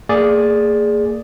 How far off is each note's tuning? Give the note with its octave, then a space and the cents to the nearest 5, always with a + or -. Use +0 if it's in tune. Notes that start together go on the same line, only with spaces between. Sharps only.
A#3 -40 G#4 +0 D5 +0